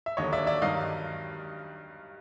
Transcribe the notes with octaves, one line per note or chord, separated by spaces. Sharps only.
E5
D#2 D3 F#3 C#5 D#5
D5 E5
D5 E5
G2 D#3 F#3 D#5 F5